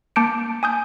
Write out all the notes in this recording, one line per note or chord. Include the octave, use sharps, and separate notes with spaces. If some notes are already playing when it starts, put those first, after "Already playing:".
A#3 A5 D6 G6 C#7 D7
G#5 D#6 G6